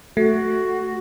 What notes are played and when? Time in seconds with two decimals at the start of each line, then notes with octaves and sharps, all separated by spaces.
0.17 A3 F#4